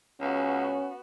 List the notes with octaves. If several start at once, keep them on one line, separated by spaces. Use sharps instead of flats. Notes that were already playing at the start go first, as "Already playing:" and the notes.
C#2 B3 C#4 F#4